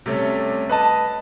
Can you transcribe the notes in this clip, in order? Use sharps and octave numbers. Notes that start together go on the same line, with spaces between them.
C3 G3 A3 C#4
B4 D#5 A5